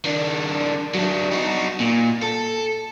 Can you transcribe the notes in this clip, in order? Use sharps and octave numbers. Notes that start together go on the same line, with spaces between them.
D#3 D4
F#3 D4
D#4 F#4
A#2
A4